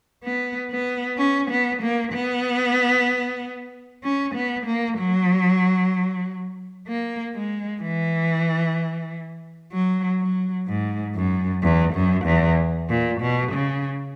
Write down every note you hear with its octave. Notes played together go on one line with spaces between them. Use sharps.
B3
B3
C#4
B3
A#3
B3
C#4
B3
A#3
F#3
A#3
G#3
E3
F#3
F#3
G#2
F#2
E2
F#2
E2
A#2
B2
C#3